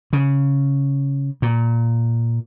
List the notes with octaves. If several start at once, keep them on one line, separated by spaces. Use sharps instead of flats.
C#3
A#2